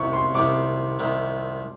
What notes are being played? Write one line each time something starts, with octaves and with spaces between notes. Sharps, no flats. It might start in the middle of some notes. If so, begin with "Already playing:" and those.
Already playing: C2 C3 D#3 C#6
C6
C2 C3 D#3 D6
C2 C3 D#3